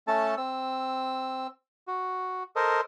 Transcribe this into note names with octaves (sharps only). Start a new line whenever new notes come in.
A3 C#4 A4 A5
C4 E6
F#4
A4 A#4 C5 D#5